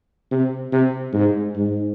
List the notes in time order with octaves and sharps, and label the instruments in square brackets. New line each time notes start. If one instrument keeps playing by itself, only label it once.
[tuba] C3
C3
G#2
G#2